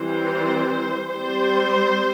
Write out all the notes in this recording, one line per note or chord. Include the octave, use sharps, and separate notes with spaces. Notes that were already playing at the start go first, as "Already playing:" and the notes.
Already playing: E3 G3 C4 C5
G3 C4 C5